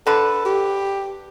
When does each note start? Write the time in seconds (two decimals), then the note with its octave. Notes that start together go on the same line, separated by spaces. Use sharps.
0.07 D3 A4 B4
0.45 G4